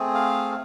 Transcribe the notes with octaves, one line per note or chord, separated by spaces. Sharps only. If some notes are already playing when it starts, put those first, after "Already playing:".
Already playing: A3 C4 G#4
F5